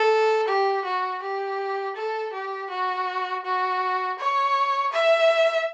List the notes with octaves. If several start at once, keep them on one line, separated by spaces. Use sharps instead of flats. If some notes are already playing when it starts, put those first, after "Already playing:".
Already playing: A4
G4
F#4
G4
A4
G4
F#4
F#4
C#5
E5